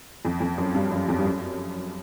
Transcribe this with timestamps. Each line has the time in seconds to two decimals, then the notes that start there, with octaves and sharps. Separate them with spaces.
0.25 F2
0.40 F2
0.58 F#2
0.75 G2
0.92 F#2
1.08 F2
1.19 G2
1.25 F#2